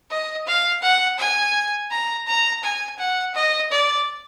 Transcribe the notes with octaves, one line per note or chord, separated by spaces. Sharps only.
D#5
F5
F#5
G#5
A#5
A#5
G#5
F#5
D#5
D5